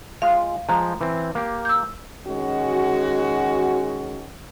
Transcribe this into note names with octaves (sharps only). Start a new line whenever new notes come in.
G#3 F4 F5
F3 G#3 A#5
E3 C4
A#3 G4
E6 G6
D#3 G#3 C#4 F#4